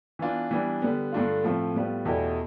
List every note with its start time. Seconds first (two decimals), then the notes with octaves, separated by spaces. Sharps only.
0.19 E3 B3 D4 F4
0.51 E3 G3 B3 D4
0.82 D3 G3 B3
1.12 G2 D3 A3 D4 F4
1.44 A2 F3 A3 C4 F4
1.74 A2 G3 B3 F4
2.05 E2 B2 A3 E4 G4